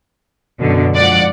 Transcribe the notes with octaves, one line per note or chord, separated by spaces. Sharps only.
F#2 B2 D3
G#2 F3 D5 F#5